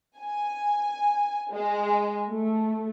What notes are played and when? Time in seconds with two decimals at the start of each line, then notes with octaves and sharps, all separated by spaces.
0.19 G#5
1.50 G#3
2.29 A3